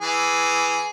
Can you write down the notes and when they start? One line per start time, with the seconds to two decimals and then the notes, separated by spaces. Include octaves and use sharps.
0.01 E3 G#4